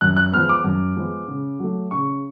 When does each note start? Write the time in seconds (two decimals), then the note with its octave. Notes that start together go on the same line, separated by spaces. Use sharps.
0.01 F#2 F#6
0.16 F#6
0.32 F3 G#3 B3 F6
0.49 D6
0.64 F#2
0.96 F3 G#3 B3
1.28 C#3
1.59 F#3 A3
1.91 C#3 C#6